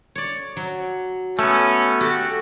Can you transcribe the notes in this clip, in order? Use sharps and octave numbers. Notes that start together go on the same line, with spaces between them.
C#5 D5
F#3
A3 B3 C#4
F#4 G4 A4